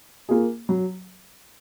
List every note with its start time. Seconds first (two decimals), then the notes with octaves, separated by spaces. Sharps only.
0.29 A#3 F4 G#4
0.69 F#3